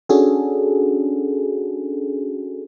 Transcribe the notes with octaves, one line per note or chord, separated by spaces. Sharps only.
C#4 D4 F#4 G#4 A4